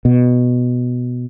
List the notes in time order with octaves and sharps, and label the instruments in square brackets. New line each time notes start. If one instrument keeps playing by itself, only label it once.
[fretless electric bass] B2